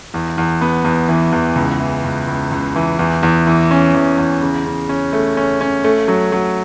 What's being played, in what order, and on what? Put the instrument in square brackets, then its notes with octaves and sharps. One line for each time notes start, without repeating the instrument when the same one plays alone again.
[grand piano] E2
E2
B3
E2
E3
E2
C#2
E3
C#2
C#2
C#2
E3
E2
E2
E3
C#4
E2
E2
C#3
C#3
C#4
A3
C#4
C#4
A3
F#3
F#3